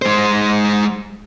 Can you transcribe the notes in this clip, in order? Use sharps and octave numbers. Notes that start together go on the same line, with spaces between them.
G#3 C5